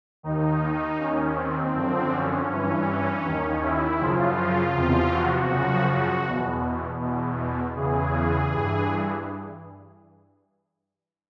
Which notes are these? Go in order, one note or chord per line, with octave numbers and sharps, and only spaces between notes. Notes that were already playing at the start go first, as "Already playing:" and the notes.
D#2 D#3 D#4
D#2 D#3 C#4
C4
F#2 D3 F3
C#4
G2 E3
D#2 D#3
E4
F#2 C#3 F3 F4
E2 C3 F3
F#4
F#2 C#3 F3
F#4
E2 B2
E2 B2
E2 C#3 E3 G#4
G2 E3